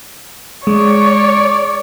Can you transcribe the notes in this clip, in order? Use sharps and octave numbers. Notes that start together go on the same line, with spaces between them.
G#3 C#5 D5